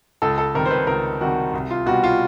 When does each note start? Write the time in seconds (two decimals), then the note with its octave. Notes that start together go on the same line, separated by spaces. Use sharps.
0.22 C#2 A4
0.38 A4
0.54 C3 D#3 G3 A#4
0.65 C5
0.71 B4
0.87 C#2 A#4
1.21 C3 D#3 G3 F#4
1.54 C2
1.70 F4
1.86 B2 G3 F#4
2.04 F4